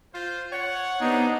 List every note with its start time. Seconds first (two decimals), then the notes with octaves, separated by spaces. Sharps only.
0.13 F4 C5
0.51 C#5 F#5
1.01 C3 B3 D4 D#4